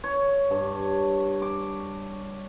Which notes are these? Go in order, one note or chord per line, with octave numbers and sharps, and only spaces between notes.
C#5
G2
D6